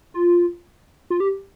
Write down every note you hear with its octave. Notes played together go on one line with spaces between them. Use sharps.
F4
F4
G4